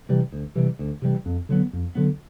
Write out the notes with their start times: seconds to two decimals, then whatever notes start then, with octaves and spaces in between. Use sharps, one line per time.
0.09 C3 E3 G3
0.32 D2
0.55 C3 E3 G3
0.79 D2
1.02 C3 E3 G3
1.26 F2
1.49 D3 F#3 B3
1.73 F2
1.95 D3 F#3 B3